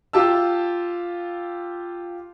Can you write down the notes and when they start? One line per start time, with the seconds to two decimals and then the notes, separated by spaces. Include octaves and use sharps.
0.13 F4 G4 A5 E6